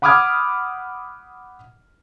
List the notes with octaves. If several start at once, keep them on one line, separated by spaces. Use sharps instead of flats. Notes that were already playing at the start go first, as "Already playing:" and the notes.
F#5 B5 D6 D#6 F6 G#6